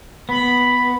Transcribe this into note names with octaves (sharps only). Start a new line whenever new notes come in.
B3 B5